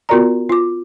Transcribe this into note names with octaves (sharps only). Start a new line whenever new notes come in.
B3 F4 F#4 A#4 D5 A#5
F4 D6